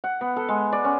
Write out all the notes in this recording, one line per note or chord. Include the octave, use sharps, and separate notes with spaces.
F#5
B3
A4
G#3
D5
C#4